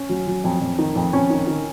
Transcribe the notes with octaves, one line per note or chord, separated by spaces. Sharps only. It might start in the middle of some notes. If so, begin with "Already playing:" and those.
Already playing: C#4
F#3
F#3
F2
F2
D#3
F2
F2 C#4
D#3
D#3